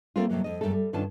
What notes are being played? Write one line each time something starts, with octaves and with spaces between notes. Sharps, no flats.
G3 A3 A#3 C4 F4
F2 C3 F#3 A#3
F2 D#5
F#2 G3 A3 A4
G3
G2 D#3 C#4 D4 F4 A5